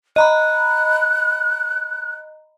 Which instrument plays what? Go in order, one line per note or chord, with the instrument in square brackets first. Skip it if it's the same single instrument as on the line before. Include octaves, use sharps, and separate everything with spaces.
[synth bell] D#5 A#5 B5 [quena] F#6